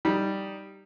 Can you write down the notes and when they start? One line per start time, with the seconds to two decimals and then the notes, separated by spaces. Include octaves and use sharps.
0.05 G3 D#4